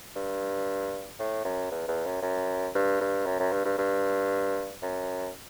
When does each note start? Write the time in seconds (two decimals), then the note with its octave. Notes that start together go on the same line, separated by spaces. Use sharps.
0.15 G2
1.19 A2
1.45 F#2
1.71 E2
1.88 E2
2.06 F#2
2.22 F#2
2.75 G2
3.01 G2
3.26 F#2
3.40 F#2
3.52 G2
3.65 G2
3.78 G2
4.82 F#2